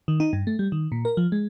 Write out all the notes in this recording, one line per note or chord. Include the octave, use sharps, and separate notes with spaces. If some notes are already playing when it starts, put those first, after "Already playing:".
D#3
D#4
G2
A3
G3
D#3
A#2
A#4
F3
G#3